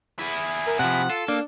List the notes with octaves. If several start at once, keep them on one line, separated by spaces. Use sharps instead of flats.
E4 G#4
A#4
C3 F3 F#5
F4 A4
A#3 D4